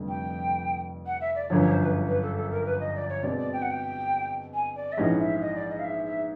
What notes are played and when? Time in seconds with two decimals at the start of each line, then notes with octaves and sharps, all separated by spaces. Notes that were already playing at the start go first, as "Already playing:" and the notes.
Already playing: F1 F2 D3 G3
0.08 G5
1.06 F#5
1.21 E5
1.35 D5
1.50 G1 F#2 D3 F3 C#5
1.61 C#5
1.71 C5
1.83 B4
2.08 B4
2.22 A4
2.37 A4
2.51 A#4
2.66 B4
2.80 D#5
2.95 D5
3.09 C#5
3.23 B2 G#3 C4 D5
3.38 D5
3.53 G5
3.62 F#5
3.71 G5
4.54 G#5
4.76 D5
4.93 E5
4.97 A#1 G#2 E3 G#3 C#4 D#5
5.20 E5
5.41 D#5
5.55 D5
5.70 D#5
5.79 F5
5.84 E5
6.06 E5